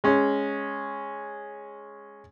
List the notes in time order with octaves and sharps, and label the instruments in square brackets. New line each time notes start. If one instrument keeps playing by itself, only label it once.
[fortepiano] G#3 C#4